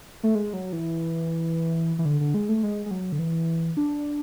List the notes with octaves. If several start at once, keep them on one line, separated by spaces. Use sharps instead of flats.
A3
G#3
F#3
E3
E3
D3
D3
G#3
A3
G#3
G#3
F#3
D3
E3
D4